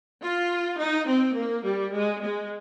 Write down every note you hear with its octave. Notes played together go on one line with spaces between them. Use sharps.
F4
D#4
C4
A#3
G3
G#3
G#3